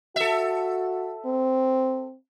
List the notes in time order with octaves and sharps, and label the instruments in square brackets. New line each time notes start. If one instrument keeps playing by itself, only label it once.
[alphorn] F#4 [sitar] A4 E5
[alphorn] C4